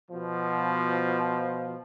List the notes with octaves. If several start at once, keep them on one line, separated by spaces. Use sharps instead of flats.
B2 F3